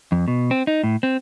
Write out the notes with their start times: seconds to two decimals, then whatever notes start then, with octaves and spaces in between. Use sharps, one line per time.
0.12 F2
0.28 B2
0.51 C4
0.67 D#4
0.83 A2
1.03 C4